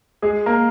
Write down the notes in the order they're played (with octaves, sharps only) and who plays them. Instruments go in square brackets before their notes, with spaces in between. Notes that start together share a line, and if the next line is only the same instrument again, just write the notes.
[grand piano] G#3 G#4
A#3 A#4